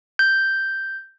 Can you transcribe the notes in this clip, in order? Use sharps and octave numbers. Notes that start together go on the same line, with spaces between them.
G6